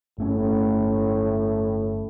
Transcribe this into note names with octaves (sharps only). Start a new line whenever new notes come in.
G1 A2 A3 C#4